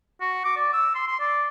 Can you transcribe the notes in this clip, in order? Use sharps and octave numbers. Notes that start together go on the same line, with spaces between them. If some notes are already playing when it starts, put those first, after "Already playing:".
F#4
D6
D5
E6
C6
C6
D5